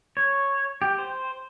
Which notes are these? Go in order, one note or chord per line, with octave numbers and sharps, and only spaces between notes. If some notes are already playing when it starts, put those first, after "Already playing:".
C#5
G4
C5